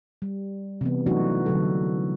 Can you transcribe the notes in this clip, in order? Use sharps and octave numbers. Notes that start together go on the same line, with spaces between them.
G3
C3 E3 B3
E3 F#3 A3 D4 D#4 F#4
D3 F#3 A4